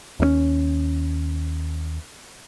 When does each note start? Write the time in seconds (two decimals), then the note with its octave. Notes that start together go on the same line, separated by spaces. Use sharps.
0.20 D#2 A#3 C#4